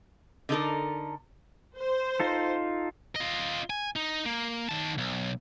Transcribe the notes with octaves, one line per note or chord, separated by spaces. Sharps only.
D3 D#4 A4 A#4
C5
D#4 F4 A4
F4 D#5
G#5
D#4
A#3
D#3 A5
B1